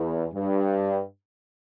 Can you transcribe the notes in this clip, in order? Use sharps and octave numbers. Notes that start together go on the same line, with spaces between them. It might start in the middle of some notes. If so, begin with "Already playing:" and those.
Already playing: E2
G2